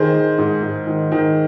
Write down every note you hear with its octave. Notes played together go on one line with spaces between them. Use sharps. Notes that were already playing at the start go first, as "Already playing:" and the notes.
Already playing: D#3 G#4 C5
D#3
G#2
G#2
D#3
D#3